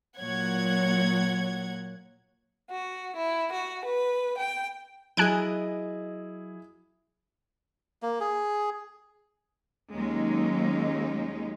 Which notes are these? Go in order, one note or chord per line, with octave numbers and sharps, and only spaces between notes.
A#2 F#3 C#5 F#5 G#6
F#4
E4
F#4
B4
G5
F#3 E4 G#4 D#5 G#5 F#6 D7
A#3
G#4
D#2 F#3 G#3 C#4 D#4